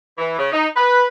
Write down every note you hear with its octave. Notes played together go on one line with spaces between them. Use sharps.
E3
C#3
D#4
B4